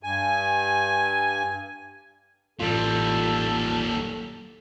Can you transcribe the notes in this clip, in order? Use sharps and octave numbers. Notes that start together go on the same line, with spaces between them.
G2 G#5
A1 A#2 G3 F4 A4